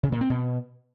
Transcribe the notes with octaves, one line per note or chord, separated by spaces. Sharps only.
C#3
A#2
C4
B2